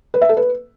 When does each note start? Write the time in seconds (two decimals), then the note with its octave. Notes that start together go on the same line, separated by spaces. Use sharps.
0.14 B4
0.22 E5
0.29 A4
0.37 B4